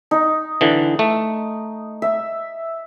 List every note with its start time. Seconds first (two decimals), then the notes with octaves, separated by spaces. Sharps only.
0.11 D#4
0.61 D3 E3
0.99 A3
2.02 E5